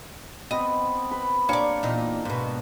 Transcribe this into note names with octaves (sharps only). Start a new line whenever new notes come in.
B3 C4 B4 D#5
B4
A#3 D4 G4 C#5 D5
E2 A#2 D#4
G#2 B2